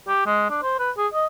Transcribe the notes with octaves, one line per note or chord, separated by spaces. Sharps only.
G4
G#3
D4
C5
B4
G#4
D#5